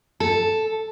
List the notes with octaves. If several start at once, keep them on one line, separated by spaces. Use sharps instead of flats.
A4